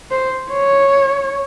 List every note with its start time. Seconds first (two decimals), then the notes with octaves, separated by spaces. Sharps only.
0.11 C5
0.52 C#5